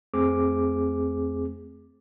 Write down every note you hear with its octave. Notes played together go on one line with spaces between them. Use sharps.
F2 A3 C4 G#4 D6